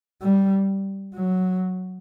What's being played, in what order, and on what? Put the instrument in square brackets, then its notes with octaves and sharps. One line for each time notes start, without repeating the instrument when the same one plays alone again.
[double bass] G3
F#3